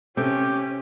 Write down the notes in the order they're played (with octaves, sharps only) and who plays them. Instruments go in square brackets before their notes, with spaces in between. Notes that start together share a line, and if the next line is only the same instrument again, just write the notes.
[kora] C3 A4 [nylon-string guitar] C4 [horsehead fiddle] C#4 [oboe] G4